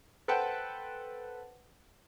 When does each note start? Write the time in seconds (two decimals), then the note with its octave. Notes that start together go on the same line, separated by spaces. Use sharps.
0.28 A4 B4 C5 F#5 G5 A5